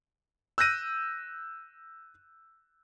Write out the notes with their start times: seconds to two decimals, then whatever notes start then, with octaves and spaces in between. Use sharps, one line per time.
0.58 E6 F#6 G6 A#6 D#7